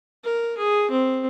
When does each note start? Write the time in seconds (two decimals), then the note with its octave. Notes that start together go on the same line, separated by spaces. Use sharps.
0.24 A#4
0.58 G#4
0.91 C4